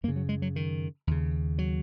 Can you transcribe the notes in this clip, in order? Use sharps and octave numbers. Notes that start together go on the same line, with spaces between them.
F#2 C#3 A#3
F#3
G#3
F#3
D#3
D#2 C#3
F#3